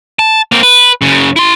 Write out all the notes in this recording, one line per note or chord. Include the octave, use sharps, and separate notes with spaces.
A5
A#3 C4
B4
F#2 C#3
E4 C6